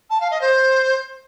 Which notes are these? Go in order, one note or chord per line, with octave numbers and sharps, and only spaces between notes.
A5
F5
D#5
C5